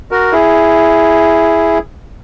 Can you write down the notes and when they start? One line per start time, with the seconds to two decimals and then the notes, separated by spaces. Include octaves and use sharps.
0.11 F#4 A#4
0.32 E4 G#4